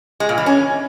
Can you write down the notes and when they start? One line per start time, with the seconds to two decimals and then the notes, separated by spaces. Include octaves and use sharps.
0.20 G#3
0.29 A#2
0.38 E3
0.46 C#4